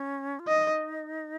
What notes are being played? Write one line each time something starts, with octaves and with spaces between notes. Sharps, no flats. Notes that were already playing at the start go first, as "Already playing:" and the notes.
Already playing: C#4
F4
D#4 D#5